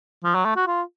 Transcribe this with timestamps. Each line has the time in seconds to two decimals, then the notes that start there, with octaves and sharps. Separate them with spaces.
0.24 F3
0.35 F#3
0.45 A3
0.56 F#4
0.67 F4